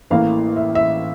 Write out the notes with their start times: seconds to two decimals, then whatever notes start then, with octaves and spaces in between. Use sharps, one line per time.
0.10 A1 A2 E3 A#3 F5
0.56 E5
0.75 E5